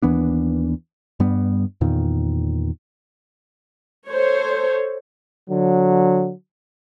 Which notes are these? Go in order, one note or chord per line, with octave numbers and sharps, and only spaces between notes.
D#2 E3 B3 D4
G2 G3 B3
E2 A#2 D#3
A4 C5 C#5
D3 F#3